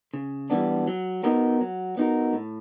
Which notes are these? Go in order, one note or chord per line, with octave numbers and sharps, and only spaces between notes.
C#3
E3 G3 B3 D4
F#3
B3 D#4 F#4 A#4
F#3
B3 D#4 F#4 A#4
A2